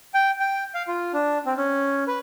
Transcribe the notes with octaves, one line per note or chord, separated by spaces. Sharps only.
G5
G5
F5
F4
D4
C4
C#4
B4